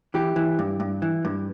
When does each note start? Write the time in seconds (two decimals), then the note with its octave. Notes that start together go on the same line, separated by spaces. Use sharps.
0.14 E3 G4
0.36 E3
0.59 G2
0.80 G2
1.02 E3
1.25 G2